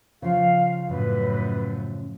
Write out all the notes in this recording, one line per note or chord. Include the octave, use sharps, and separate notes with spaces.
C#3 F3 F5
F#2 A2 B4